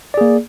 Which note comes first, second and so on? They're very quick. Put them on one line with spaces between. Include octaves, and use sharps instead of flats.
D5 G#4 A#3